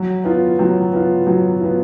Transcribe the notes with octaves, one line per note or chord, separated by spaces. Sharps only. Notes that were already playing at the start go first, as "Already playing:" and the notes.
Already playing: F#3
B3 F4
F#3
B3 F4
F#3
B3 F4